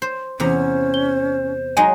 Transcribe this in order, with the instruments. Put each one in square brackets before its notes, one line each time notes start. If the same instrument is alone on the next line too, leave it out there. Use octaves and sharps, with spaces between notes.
[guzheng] C5
[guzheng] E2 C3 A#5 [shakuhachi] C#4 [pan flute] C5
[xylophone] G7
[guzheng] F#3 G#3 D#4 [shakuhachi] D#5 [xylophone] G#5